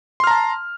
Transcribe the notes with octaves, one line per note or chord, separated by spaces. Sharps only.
A5 A#5 C6 F6